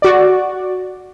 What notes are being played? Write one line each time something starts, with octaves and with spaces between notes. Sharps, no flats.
F#4 D5